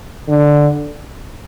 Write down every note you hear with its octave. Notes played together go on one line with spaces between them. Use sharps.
D3